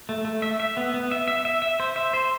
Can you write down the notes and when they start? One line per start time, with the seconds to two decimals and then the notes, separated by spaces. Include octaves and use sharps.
0.09 A3
0.25 A3
0.42 E5
0.60 E5
0.77 B3
0.94 B3
1.11 E5
1.28 E5
1.45 E5
1.62 E5
1.80 C5
1.96 E5
2.14 C5